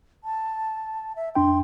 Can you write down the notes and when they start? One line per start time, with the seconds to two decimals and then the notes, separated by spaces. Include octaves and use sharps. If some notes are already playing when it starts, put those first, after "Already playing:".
0.24 A5
1.16 E5
1.35 F2 D4 G5 C6